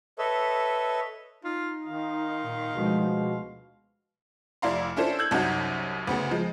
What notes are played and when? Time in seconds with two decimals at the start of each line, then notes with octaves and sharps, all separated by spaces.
0.18 A4 B4 C#5 D#5 E5
1.44 D#4 F4
1.87 D#3 F5 C6
2.41 A#2
2.72 D2 B2 F3 G#3
4.62 F1 E4 D5 F5 A#5 C6
4.96 C#4 D4 E4 F4 A4 C5
5.19 E6 G6 G#6 F#7
5.31 C2 F#2 D#4 F#4
6.07 D2 C#3 B3
6.31 F3 G#3